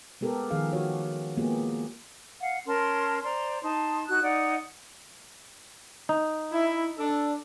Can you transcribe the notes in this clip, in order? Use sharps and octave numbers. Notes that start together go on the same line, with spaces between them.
G#3 B3 G4 A4 A#4
D#3 F3 G#4 F5
F#4 G4 C#5
G#3 A#3 B3 F4 G4 G#4
F5 F#5
C#4 A#4 A5 C6
C5 D5 A#5 C6
D#4 A5 C6
D#4 F#4 F#6
D#4 D5 F#5
D#4
E4
D4 A4